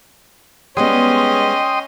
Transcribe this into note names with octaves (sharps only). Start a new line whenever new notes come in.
G3 G#3 B3 C#4 D#5 G5 C6 D#6